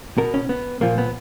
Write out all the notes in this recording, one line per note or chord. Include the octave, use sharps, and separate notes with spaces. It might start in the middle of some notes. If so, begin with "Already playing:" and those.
B2 A#4
C#4
B3
A#2 F3 A#3
B3